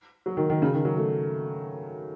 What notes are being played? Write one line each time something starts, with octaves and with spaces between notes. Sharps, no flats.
F#3
D#3
D#3
C#3
D#3
F#3
A3